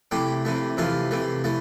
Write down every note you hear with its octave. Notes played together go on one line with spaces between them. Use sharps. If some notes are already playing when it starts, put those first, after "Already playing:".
C3 E3 A3 G4
C3 E3 A3
C3 E3 A3 F4
C3 E3 A3
E3 A3